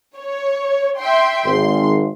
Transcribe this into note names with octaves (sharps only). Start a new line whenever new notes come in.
C#5
E5 G5 C6
G#1 C6